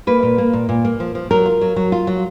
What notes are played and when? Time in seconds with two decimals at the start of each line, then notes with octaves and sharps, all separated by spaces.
0.07 A#3 B4
0.23 A#2
0.38 A#3
0.53 A#2
0.69 A#2
0.85 A#3
1.00 F3
1.15 F3
1.31 F#3 A#4
1.46 F4
1.61 F#3
1.76 F#3
1.92 F4
2.07 F#3